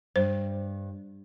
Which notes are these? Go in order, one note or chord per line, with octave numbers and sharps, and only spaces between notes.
G2 C5